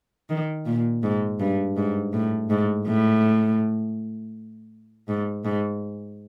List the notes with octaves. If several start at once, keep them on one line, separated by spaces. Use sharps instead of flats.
D#3
A#2
G#2
G2
G#2
A2
G#2
A2
G#2
G#2